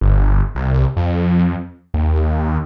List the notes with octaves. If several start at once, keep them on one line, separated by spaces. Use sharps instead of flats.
G1
C2
F2
D#2